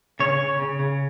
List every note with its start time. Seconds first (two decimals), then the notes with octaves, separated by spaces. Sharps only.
0.20 C#3 C#5
0.40 C#3
0.59 C#3
0.79 C#3